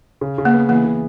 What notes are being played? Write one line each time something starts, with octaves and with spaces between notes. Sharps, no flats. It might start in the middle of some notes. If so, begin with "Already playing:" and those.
C#3
C#3
A#3
B3
E3 A#3
C#3